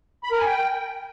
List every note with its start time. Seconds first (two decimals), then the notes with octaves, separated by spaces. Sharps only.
0.24 B5
0.31 A#4
0.39 G#5
0.47 G5